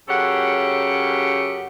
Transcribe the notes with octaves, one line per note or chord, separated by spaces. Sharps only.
F#2 C#3 G4 A4 C#5 F#5